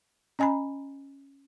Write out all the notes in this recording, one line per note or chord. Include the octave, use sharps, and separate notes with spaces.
C#4 D#5 G#5 A#5 B5